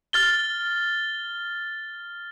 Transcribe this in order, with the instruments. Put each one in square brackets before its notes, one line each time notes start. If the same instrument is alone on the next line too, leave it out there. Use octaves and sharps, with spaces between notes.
[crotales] F6 A6 G7